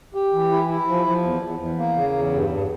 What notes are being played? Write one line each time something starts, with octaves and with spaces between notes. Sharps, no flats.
G4
E3
E4
E4
F3
F3
E2
E2
E2
A#3
C#3
E2
G2
G2